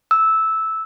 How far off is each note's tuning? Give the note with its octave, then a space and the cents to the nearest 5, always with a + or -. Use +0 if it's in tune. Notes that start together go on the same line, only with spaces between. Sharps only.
E6 -10